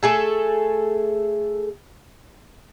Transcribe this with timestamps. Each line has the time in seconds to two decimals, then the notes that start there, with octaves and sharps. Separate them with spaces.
0.03 A3 G#4 A4